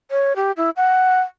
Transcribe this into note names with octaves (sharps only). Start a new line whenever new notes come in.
C#5
G4
E4
F#5